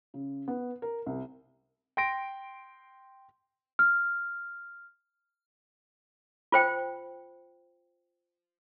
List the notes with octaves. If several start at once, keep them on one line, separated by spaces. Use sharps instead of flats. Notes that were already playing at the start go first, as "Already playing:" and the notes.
C#3
B3
A#4
C2
G5 C6 A#6 D7
F6
F4 C5 G5